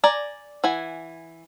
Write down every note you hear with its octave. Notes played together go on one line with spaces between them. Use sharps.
D5 G#5 A#5
E3 F#5 G#5